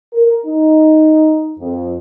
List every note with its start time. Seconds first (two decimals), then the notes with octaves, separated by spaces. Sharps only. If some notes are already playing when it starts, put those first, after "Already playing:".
0.12 A#4
0.44 D#4
1.58 F2